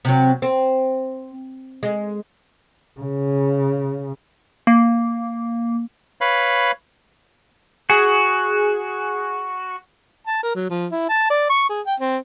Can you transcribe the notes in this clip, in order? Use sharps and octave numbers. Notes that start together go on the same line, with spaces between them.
C3 F#3
C4
G#3
C#3
A#3
B4 C#5 F5 B5
F#4 G#4
A5
A#4
F#3
F3
E4
A5
D5
C#6
G#4
G5
C4